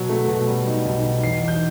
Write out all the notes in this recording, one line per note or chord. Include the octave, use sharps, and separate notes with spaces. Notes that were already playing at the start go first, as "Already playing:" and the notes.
Already playing: B2 F#3
A3
B2
G3
D#4
B1
D#4
E2 C7
E2 G6